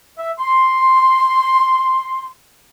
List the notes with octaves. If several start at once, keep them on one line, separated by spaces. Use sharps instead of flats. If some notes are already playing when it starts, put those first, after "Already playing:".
E5
C6